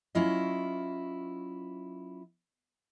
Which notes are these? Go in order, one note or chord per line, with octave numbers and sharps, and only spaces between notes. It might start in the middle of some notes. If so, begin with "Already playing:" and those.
F#3 C#4 E4 F4 D#5